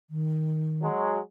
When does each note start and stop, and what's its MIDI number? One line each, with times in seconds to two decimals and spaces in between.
0.10 0.88 51
0.82 1.19 54
0.82 1.19 56